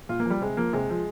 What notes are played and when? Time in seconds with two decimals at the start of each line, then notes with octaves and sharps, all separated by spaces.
0.09 A#2 F4
0.20 A#3
0.26 F3 G3
0.41 C3 G#3
0.57 F3 A#3
0.73 C3 G#3
0.90 F3